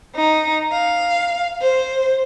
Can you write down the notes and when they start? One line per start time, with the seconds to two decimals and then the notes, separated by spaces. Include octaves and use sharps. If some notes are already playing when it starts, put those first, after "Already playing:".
0.16 D#4
0.72 F5
1.62 C5